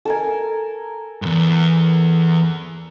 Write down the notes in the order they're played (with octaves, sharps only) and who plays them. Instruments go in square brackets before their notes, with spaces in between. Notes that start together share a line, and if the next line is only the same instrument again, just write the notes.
[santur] A4 A#4 G#5
[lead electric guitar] E2 G2